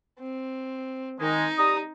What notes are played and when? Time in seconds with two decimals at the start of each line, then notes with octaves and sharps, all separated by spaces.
0.19 C4
1.20 D#3 G#3 D#4
1.58 G3 A#5 D#6